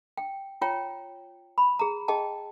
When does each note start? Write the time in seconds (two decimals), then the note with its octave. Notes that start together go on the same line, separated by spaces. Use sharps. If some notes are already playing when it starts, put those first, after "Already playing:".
0.18 G5
0.61 F4 C#5 G5 A#5
1.58 B5
1.79 G#4 A#5
2.08 G#4 D#5 G5 A5